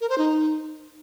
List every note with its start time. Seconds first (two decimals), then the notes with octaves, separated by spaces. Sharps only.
0.01 A#4
0.09 C5
0.18 D#4